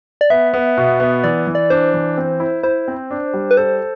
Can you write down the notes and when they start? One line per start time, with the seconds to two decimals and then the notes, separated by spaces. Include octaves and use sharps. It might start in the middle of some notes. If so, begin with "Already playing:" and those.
0.21 D5
0.30 B3 E5
0.54 B3
0.77 B2
1.00 B3
1.24 E3 D5
1.47 E3
1.55 D5
1.70 D4 C5
1.94 E3
2.17 C4
2.40 E4
2.63 E4 C5
2.88 C4
3.11 D4
3.34 G3
3.51 B4
3.57 A4 C5